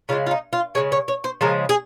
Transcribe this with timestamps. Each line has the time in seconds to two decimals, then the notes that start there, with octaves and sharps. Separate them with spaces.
0.09 C#3 F3 G#3 F4
0.26 F4
0.31 D#4
0.53 F4
0.75 C#3 F3 G#3 C#5
0.92 C#5
1.08 C#5
1.24 C5
1.41 C#3 F3 G#3 A#4
1.69 G#4